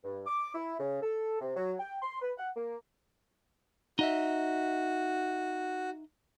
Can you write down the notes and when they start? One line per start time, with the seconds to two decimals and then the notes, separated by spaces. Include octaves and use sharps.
0.04 G2
0.27 D6
0.55 E4
0.80 C#3
1.03 A4
1.41 C3
1.57 F#3
1.80 G5
2.02 C6
2.22 B4
2.38 F#5
2.57 A#3
3.99 D#4 F#4 D#5 E5